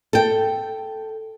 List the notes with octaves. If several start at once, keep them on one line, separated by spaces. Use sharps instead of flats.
A4 G5